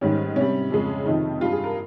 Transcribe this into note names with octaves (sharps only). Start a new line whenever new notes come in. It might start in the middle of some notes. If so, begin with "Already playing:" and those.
G#2 D#3 G3 C#4
C3 G3 C#4
F2 C#3 G#3
F2 C3 D#3 D#4
G2 G3 F4
G#4
A#4